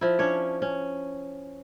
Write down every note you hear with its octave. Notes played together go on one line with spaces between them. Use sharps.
F3 E4
C#4 D4 C#5
C#4